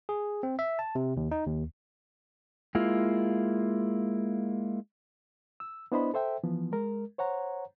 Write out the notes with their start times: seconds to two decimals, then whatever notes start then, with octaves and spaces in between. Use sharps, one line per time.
0.09 G#4
0.43 C4
0.59 E5
0.79 A5
0.95 C3
1.17 D#2
1.31 D#4
1.46 D#2
2.75 G#3 A#3 E4 F4
5.60 E6
5.92 B3 D4 E4 C5 D#5 B5
6.14 A4 C5 E5 G5
6.44 E3 F3 B3
6.72 G#3 A#4
7.18 C5 C#5 F#5 A#5